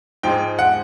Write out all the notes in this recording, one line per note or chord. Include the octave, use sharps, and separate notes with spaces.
G#2 F3 G#3 G5
F#5